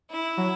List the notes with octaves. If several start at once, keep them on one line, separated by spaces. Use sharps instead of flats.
E4
F#3